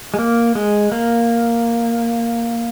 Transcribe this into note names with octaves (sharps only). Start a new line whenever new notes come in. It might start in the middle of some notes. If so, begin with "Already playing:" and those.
G#3
A#3
G#3
A#3